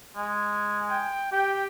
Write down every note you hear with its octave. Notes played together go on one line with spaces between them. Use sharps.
G#3
G5
G4 G5